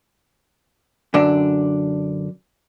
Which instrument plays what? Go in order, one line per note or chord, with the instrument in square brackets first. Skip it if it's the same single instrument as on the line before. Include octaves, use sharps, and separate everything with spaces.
[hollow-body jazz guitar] F#2 D3 D4